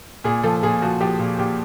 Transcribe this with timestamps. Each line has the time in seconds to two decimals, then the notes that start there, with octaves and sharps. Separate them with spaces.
0.24 A#2 G#4
0.43 F3 A4
0.63 A#2 G#4
0.82 F3 F#4
1.00 F3 G4
1.19 A#2
1.39 A#2 G4